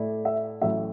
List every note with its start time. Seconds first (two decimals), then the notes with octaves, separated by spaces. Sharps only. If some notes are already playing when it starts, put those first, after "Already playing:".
Already playing: A2 A3 E4 D5
0.25 E5
0.61 A1 A2 F#3 E5